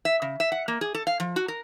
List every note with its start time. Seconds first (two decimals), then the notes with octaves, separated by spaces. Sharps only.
0.05 E5
0.22 C#3
0.40 E5
0.52 F#5
0.68 A#3
0.81 G#4
0.95 A4
1.07 F5
1.20 F3
1.36 F#4
1.48 A#4